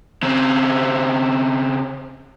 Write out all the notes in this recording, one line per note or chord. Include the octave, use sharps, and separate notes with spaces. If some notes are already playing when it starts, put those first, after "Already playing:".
C#3 C4